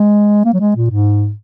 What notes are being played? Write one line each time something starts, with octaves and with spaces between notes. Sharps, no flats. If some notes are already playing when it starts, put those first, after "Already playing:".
Already playing: G#3
A#3
F#3
G#3
A#2
G#2